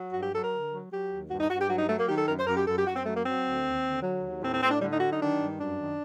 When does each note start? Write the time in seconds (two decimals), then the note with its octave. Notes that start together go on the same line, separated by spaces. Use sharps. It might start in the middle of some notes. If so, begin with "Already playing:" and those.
Already playing: F#3
0.13 G2 F#4
0.23 G4
0.32 F#3 A4
0.42 A#4
0.52 D3
0.71 F#3
0.91 F#3 G4
1.11 D#2
1.29 G2 F#4
1.40 D#4
1.49 G2 F#4
1.60 G4
1.68 F#3 F#4
1.78 D#4
1.88 F#3 A3
1.99 A#3
2.07 D#3 G4
2.17 A4
2.27 F#2 A#4
2.38 C5
2.47 F#2 A#4
2.57 G4
2.66 F#2 A4
2.76 G4
2.86 F#2 F#4
2.95 C4
3.05 F#3 A3
3.15 A#3
3.25 F#3 C4
3.45 D2
3.64 D#2
3.84 D3
4.02 F#3
4.23 D#2
4.41 A2 C4
4.52 C4
4.62 A2 C4
4.71 D4
4.80 D3 G3
4.91 D#4
5.00 F#3 F#4
5.11 D#4
5.20 D#3 D4
5.40 G2
5.59 F#2 D4
5.79 D#3